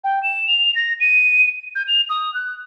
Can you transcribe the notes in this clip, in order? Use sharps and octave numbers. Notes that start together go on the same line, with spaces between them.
G5
E7
F7
A#6
D#7
G6
F7
D#6
F#6